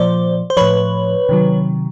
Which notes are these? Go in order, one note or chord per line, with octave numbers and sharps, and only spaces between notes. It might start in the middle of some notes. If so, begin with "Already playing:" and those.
Already playing: A#2 F3 C5 D5
C5
A2 F3 B4 C#5
C3 D#3 F#3